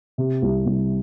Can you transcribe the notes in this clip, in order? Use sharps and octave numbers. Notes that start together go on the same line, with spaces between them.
C3
C2
C2